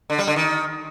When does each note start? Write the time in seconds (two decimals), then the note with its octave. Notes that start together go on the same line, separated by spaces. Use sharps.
0.10 D3
0.18 G3
0.27 D3
0.36 D#3